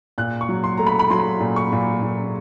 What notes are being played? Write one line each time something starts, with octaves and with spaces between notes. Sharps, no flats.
A#2 F#6
C#6
F#3
C6
A3 A#5
B5
B5
F#3 C6
A#2
C#6
A#2
A#2